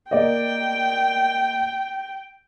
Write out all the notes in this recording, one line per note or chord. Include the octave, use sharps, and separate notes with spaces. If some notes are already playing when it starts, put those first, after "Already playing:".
A#3 D5 D#5 G5